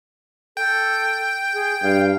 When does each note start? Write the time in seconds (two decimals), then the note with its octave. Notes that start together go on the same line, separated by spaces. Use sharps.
0.57 A4 G5
1.54 G#4
1.83 G2 F5